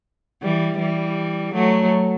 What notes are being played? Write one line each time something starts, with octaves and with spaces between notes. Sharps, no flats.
E3 G3
E3 G3
F#3 A3